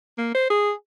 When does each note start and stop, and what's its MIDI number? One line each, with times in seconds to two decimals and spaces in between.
0.18 0.33 58
0.35 0.48 72
0.50 0.72 68